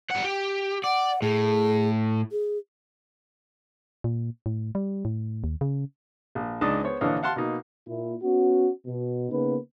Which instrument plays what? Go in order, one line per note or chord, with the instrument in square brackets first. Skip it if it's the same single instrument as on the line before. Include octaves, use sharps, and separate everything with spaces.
[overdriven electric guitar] G3 F#5
G4
[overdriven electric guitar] D5 [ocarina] F#5
[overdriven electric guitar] A2 [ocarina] G#4
[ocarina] G#4
[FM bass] A#2
A2
G3
A2
D#2
C#3
[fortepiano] A#1
C#2 D4 D#4 D#5 A5
B3 C5 C#5
A#1 D3 E3 C#5 D#5 F5
F5 F#5 A5 C6
B2 A#3 D#4
[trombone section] A#2 E4
B3 C#4 F#4
B2
C#3 A#3 B3 D#4 B4